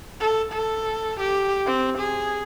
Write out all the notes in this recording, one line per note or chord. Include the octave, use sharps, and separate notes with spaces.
A4
A4
G4
C4
G#4